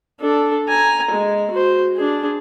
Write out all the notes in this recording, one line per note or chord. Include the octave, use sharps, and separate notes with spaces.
D4 A4
G#5 A#5
G#3
F#4 C5
D4 G#4